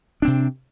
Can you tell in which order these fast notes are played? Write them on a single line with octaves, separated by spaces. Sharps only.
D4 C4 C3